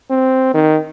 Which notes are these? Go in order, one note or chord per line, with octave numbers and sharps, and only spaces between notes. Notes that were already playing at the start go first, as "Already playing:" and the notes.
C4
D#3